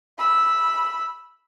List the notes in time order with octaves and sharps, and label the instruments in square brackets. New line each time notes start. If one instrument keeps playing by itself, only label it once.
[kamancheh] B5 E6